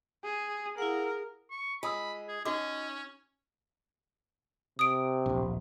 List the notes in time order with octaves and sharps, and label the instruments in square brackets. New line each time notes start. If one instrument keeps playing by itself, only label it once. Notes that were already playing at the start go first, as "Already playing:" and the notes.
[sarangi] G#4
[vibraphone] E4 F5 F#5 [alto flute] G#4 [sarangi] A#4
[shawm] C#6
[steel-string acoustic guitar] G#3 [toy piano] F4 D#6 E6 [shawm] B5
[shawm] G#4
[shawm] C#4 [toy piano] D#4 F#4 D6 [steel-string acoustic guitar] D#5
[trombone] C3 [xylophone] D#6 D7
[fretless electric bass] D1 A#1